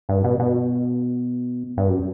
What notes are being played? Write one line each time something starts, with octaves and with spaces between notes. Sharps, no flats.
G2
B2
B2
G2
F#2